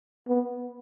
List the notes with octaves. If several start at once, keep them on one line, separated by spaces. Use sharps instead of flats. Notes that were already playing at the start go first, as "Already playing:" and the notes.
B3